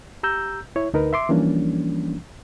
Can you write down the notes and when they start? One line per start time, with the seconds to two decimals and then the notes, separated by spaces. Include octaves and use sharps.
0.23 G4 A#5 E6 G6
0.76 E4 C#5
0.93 D2 D#4 A#4 B4
1.13 E5 C6 D6
1.29 E3 F3 G3 A#3 C#4 D4